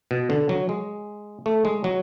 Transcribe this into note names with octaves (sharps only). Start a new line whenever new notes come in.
B2
D3
F#3
G#3
A3
G#3
F#3